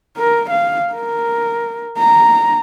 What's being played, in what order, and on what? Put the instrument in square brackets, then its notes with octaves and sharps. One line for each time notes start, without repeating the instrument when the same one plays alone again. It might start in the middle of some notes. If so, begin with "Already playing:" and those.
[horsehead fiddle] A#4
F5
A#4
A#5